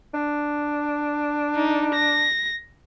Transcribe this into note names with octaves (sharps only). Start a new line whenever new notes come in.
D4
D#4
A#6